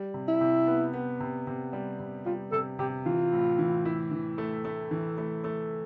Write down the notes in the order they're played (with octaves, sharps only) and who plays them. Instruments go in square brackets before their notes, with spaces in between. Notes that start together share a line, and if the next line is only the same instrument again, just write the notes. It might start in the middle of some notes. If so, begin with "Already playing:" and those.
Already playing: [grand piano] G3
C3
[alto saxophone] E4
[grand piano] C3
B3
B3
C3
C3
G3
C3
[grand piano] G3 [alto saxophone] F4
[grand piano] C3 [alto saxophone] A4
[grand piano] C3 [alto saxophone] G4
[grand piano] E3 [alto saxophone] F4
[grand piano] A2
E3
E4
E3
A3
A3
E3
A3
A3